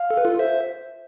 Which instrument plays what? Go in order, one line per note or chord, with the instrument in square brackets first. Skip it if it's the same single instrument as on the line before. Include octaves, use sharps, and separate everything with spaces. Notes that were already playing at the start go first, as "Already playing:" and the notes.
Already playing: [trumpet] F5
[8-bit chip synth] A4
B4
F4 A4
C5 E5